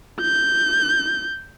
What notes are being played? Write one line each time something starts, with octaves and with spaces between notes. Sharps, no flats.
G6